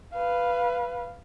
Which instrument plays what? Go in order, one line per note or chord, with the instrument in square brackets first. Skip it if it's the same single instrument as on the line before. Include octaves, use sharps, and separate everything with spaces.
[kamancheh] B4 F5